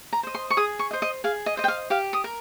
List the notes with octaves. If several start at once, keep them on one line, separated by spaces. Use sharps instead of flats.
A#5
C5 D#5
C6
C#6
G#4 D#6
C#6
D#5
C5
D#5
G#4 F5
D#5
C5 D#5
G5
F5
G4 F5
D#6
A#4